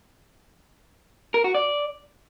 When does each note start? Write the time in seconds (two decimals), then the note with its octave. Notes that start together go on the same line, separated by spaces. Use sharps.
1.34 A#4
1.44 F#4
1.54 D5